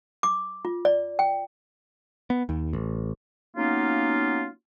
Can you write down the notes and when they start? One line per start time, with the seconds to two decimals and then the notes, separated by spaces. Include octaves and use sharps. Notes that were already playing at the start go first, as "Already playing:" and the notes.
0.23 D6
0.65 F4
0.85 D5
1.19 G5
2.30 B3
2.49 D#2
2.73 A1
3.55 F#3 A#3 B3 C#4 D#4 F4